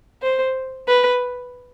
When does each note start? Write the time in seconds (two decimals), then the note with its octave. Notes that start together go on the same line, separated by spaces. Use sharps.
0.22 C5
0.88 B4